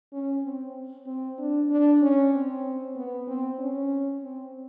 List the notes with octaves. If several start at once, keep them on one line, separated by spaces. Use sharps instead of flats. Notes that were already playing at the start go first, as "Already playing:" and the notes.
C#4
C4
C4
D4
D4
C#4
C4
B3
C4
C#4
C4